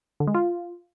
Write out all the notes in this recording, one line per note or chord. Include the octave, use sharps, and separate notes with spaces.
D3
G#3
F4